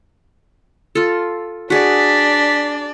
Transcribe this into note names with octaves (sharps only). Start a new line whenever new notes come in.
F4 A4
D4 F#4 G#4 D5 B6